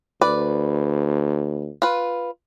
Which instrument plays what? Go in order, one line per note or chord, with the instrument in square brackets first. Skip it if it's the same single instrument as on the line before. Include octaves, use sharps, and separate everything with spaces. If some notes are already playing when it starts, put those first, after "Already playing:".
[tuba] D2 [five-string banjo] B4 D5
[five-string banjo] F4 B4